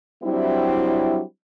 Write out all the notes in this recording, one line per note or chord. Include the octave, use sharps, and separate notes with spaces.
F#3 G3 C4 D4 E4